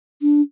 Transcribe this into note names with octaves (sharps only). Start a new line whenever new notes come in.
D4